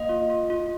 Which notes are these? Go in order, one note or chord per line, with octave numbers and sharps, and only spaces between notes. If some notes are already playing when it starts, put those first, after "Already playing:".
Already playing: A#3 D#5
F4
F4
F4